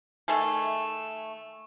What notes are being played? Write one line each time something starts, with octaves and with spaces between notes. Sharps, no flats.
D#3 A3 G#4 A4